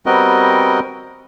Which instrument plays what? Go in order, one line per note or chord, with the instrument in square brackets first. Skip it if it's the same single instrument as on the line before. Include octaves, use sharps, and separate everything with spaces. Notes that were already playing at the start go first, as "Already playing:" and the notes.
[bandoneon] G3 B3 C4 F#4 A#4 D#5